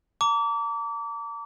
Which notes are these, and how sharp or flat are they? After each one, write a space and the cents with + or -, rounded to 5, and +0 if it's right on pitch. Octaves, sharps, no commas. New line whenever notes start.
A#5 -35 D6 -30